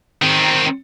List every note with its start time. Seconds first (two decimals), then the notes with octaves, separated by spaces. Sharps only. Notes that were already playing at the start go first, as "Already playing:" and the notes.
0.22 D#3 C4